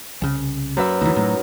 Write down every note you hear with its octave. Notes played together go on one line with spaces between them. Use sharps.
C2 C#3
F#2 B4 E5
D2 E3 D#4
A2 F#3